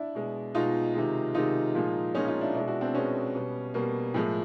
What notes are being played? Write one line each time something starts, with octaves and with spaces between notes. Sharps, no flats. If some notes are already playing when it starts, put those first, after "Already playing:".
Already playing: D4 E4
B2 G#3
B2 G#3 D#4 F4
C3 D#3 G#3
C3 D#3 G#3 D#4 F4
A#2 F3 G#3
A#2 F3 G#3 C#4 D#4
D#4 F4
D4 E4
B2 G#3 D4 E4
E4 F#4
C4 D4
B2 G#3 B3 C#4
B2 G3
B2 G3 A#3
A2 F3 G#3